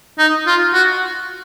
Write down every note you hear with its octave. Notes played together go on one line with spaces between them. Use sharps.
D#4
F4
F#4